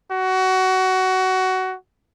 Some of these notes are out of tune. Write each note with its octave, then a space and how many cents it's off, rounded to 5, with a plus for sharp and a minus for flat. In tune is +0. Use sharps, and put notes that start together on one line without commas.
F#4 +20